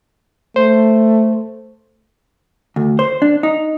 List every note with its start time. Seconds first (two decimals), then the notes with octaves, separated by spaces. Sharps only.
0.56 A3 C5
2.76 D2
2.99 C5
3.22 D4
3.43 D#4